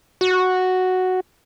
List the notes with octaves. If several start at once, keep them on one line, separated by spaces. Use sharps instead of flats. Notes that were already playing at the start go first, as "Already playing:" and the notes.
F#4